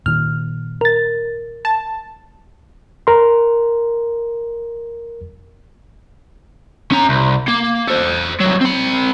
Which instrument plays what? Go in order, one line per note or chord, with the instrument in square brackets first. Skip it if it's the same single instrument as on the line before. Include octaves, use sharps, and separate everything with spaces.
[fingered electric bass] A#2 D#3 [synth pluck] F6
[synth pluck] A#4 A6
[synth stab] A5
[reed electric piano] A#4 C6
[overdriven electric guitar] C#4 A#5
C2
A#3
A4 C5
C2 F#3
C4 B5